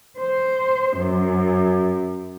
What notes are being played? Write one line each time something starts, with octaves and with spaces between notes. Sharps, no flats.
C5
F#2